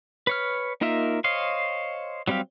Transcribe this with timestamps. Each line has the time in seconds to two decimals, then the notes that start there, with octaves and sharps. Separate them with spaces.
0.27 B4 C#5 F6
0.81 A#3 D#4 F4 A#4 E5
1.24 C5 C#5 D#5 F5
2.28 F#3 G3 C4 G4 F5